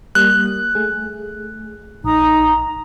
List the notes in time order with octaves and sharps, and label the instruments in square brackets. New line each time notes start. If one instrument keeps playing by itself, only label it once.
[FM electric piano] G3 A#3 D#6 [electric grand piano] F#6
[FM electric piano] A3 G#4
[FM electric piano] A#1 [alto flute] D#4 [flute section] A#5 D#6